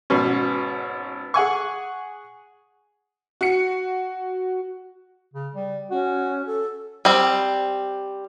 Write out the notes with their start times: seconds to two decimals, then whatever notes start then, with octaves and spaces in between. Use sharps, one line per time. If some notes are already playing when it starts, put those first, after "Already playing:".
0.10 G#1 B2 C#4
1.34 G#4 F#5 G#5 C#6
3.41 F#4 C#7
5.34 C#3
5.53 G3
5.91 C#4 F#4
6.46 A4
7.05 G3 C4